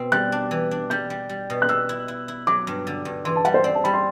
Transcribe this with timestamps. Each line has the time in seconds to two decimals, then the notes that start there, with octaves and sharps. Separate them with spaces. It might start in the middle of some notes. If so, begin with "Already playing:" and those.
Already playing: B2 C4
0.12 G3 F#6
0.32 D4
0.51 E3
0.71 D4
0.90 G3 G6
1.10 G3
1.29 G3
1.50 B2
1.62 F#6
1.69 B2 E6
1.89 E4
2.08 E4
2.28 E4
2.47 F#3 D6
2.67 G2
2.87 D3
3.05 G2
3.25 E3 C6
3.36 A5
3.45 G3 F#5
3.54 C5
3.64 C4 D5
3.75 A5
3.84 G3 B5
3.93 C6